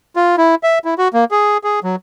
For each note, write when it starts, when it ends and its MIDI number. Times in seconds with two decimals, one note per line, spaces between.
0.16 0.36 65
0.38 0.55 64
0.63 0.79 76
0.85 0.94 64
0.98 1.08 66
1.14 1.24 58
1.31 1.57 68
1.64 1.80 68
1.84 1.96 54